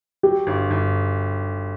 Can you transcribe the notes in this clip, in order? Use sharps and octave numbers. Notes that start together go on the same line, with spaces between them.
F#3 G4
G1
G1